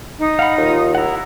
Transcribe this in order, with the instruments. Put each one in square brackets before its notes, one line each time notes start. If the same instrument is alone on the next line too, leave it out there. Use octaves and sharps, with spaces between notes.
[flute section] D#4 D#6
[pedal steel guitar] F5 F#5 B5
[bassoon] D#2 [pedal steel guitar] F4
[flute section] E4 [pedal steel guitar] F#5 A#5